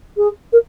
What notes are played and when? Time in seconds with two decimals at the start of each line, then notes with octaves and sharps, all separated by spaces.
0.17 G#4
0.53 A#4